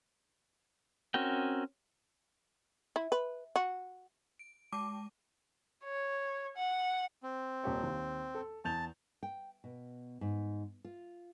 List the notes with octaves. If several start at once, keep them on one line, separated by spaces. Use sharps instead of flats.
C4 C#4 F#4 A#4 G5
E4
B4
F#4
D7
G#3 A5 D6 D#7
C#5
F#5
C4
D#1 G4 C#5
D#2
A4
E2 A5 G6 F7
G5
B2
G#2
F4